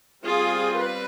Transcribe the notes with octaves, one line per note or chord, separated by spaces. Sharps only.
G3 C4 F4 G#4
B4